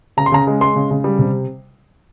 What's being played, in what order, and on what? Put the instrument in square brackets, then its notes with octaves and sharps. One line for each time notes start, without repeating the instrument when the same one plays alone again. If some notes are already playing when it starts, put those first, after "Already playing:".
[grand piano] C#3 A#5
C6
C#3 A#5
G#3
G#3 C6
C#3
C#3
G3
C3